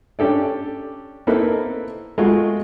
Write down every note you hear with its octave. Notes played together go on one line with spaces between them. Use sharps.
C#4 D4 G4 A4 D5
A#3 C4 D#4 E4 A4 B4
G#3 A3 F4 F#4